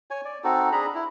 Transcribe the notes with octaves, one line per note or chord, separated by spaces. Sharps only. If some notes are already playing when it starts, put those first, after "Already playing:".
C#5 G#5
D5
C4 D#4 F#4 A4
D4 G#4 A#5 B5
E4